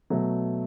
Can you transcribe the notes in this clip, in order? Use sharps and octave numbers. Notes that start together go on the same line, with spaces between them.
B2 F#3 A3